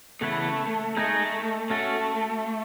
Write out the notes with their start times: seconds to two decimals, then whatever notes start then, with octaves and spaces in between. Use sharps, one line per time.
0.21 C#3 E3 A3 B3 E4 B4
0.97 G#3 A3 D#4 G#4 D#5
1.70 A3 C#4 F#4 A4